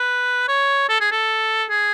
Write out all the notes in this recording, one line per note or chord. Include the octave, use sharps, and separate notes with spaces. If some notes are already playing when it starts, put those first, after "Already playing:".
Already playing: B4
C#5
A4
G#4
A4
G#4